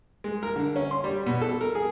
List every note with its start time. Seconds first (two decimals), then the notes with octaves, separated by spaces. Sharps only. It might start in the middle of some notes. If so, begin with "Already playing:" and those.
0.24 G#3
0.43 A#4
0.56 D3
0.76 C#4
0.91 C6
1.04 G3
1.26 B2
1.42 A4
1.61 A#4
1.75 G#4